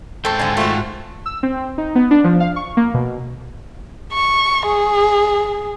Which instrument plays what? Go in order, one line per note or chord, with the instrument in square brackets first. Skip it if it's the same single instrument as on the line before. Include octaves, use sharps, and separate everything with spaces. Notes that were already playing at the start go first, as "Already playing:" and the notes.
[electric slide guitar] G#2 C5 G5 [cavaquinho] A4 C#6
[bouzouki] D3 F3 [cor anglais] G#5
[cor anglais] A3 [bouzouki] F4 F#4
[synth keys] E6
C4
D#4
B3
D4
F3
F5
C#6
A#3
B2
[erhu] C#6
G#4